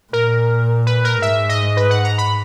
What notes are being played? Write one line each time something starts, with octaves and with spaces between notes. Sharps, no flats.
A#2 A#4
B4
A#4
G#2 E5
D#5
B4
F#5
A#5
B5